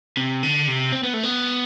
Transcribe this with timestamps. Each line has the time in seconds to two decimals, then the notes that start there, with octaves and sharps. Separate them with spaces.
0.17 C3
0.43 D3
0.68 C3
0.92 C4
1.03 B3
1.14 A3
1.23 B3